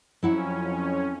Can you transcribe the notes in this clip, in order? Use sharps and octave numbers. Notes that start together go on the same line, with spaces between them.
F2 F#3 C#4 E4 F#5